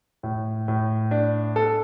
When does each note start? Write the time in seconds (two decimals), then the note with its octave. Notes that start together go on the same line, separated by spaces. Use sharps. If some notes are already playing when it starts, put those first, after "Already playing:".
0.23 A2
0.68 A2
1.11 D4
1.56 A4